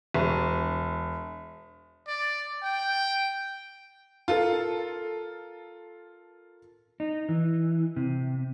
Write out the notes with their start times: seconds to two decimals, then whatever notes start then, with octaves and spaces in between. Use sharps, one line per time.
0.14 E1
2.08 D5
2.63 G5
4.28 F4 A4 A#4
7.00 D#4
7.29 E3
7.96 C3